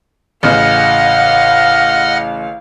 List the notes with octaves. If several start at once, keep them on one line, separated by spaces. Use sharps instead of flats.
A1 C#3 D#5 F5 F#5 F6